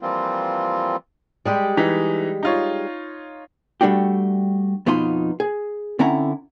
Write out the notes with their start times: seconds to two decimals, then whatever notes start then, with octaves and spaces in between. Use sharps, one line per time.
0.01 E3 F3 G3 A#3 C4 F4
1.45 G3 G#3 G4
1.77 E3 D#4 B6
2.43 D#4 F4 C#5
3.81 G3 A3 D4 F#4 G4
4.86 F2 B2 B3 D#4 F4 C6
5.40 G#4
5.99 D3 C4 C#4 E4 F#5 A#5